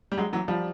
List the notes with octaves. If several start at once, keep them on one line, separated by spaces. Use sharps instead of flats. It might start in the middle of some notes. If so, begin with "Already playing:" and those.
G3
F#3 G#3
E3 F#3
F3 G3